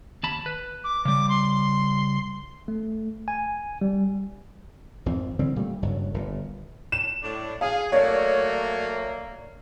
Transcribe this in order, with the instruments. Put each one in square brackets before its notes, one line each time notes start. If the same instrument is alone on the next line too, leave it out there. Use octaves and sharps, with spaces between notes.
[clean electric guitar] D#2 A5 B5
B4
[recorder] D6
[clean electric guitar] C#3 G3 [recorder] D6
[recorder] C6
[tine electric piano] A3
G#5
G3
[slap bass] G#1 F2 F3 C4
D3 E3 G3 C4
A#2 G3 A3
F#1 G2 F#3
G1 A#2
[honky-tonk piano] E7
[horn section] A2 D4
[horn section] G#4 [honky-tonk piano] F5
[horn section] F#3 A3 A#3 [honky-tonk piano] C#5 D5